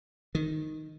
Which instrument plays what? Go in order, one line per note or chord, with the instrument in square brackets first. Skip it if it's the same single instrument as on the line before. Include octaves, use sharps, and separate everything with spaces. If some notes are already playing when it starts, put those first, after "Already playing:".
[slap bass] D#3